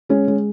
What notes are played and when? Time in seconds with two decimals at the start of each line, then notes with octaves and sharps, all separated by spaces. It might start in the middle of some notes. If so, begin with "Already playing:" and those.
0.09 G#3 C#4
0.28 G#3